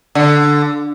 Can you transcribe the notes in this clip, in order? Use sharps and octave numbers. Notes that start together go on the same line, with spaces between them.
D3